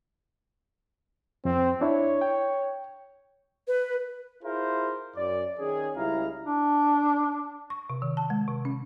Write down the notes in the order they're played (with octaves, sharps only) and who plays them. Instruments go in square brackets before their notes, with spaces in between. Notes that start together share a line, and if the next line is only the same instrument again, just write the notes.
[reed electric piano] F2 [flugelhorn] C4
[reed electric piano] D4 E4 [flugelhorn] C#5
[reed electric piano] G5
[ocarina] B4
[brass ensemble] E4 F4 G#4 A#4 C5
F#2 D5
D#3 C#4 G#4
C#2 G3 E4 F5 A#5
[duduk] D4
[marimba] C#6
C3
D#3
A5
G#3
C3
C#4